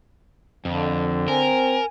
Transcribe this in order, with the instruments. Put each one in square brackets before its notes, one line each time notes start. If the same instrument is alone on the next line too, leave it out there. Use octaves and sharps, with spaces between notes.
[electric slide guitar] F2 [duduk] D3
[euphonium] C4 [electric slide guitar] A#4 [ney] G#5